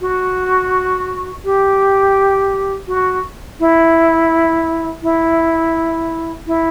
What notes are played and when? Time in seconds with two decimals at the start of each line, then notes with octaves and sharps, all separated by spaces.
0.01 F#4
1.45 G4
2.88 F#4
3.60 E4
5.03 E4
6.47 E4